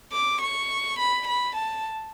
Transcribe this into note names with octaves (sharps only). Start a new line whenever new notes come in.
D6
C#6
B5
B5
A5